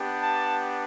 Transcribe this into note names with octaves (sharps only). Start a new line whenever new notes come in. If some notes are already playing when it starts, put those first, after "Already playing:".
Already playing: B3 D4 G4
A5